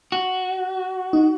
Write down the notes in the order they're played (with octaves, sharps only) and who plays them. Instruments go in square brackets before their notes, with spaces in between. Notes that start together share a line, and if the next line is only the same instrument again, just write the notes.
[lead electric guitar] F#4
[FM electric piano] D#4